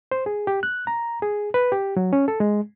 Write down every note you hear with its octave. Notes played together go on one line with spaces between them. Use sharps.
C5
G#4
G4
F#6
A#5
G#4
B4
G4
F#3
C#4
A4
G#3